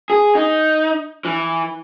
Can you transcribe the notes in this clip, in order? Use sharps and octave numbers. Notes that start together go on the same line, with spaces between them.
G#4
D#4
E3